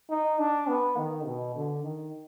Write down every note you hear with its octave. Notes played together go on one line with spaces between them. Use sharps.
D#4
D4
B3
D#3
B2
D3
D#3